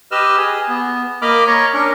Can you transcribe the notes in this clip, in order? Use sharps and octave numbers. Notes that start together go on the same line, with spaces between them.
G4 B4 D#5 E6 F6
G#4
B3
A#3 D#5 B5 D6 F6
C#5 A#5 C#6
C#4 D4 A#4